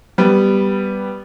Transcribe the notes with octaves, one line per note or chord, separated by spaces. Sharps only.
G3 B3